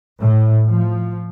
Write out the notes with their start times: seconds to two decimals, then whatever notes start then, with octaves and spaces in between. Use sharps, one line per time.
0.21 A2
0.67 F3